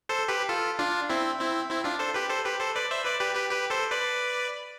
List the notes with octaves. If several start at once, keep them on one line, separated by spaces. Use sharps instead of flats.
A4 C5
G4 B4
F4 A4
D4 F4
C4 E4
C4 E4
C4 E4
D4 F4
A4 C5
G4 B4
A4 C5
G4 B4
A4 C5
B4 D5
C5 E5
B4 D5
G4 B4
G4 B4
G4 B4
A4 C5
B4 D5